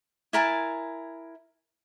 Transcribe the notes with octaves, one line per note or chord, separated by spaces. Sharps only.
E4 A#4 G#5 A5